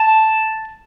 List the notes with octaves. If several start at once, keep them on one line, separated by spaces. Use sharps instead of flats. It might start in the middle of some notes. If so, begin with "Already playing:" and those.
Already playing: A5